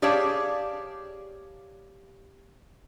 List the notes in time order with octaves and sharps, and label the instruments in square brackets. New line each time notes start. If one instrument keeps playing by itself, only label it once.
[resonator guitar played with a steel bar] G4 G#4 C#5 D5 F5 A5